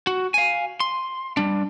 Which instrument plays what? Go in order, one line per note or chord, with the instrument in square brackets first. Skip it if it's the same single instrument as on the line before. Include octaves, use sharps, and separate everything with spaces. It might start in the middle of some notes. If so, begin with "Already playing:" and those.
[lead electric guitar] F#4
F5 G#5
C6
G3 D4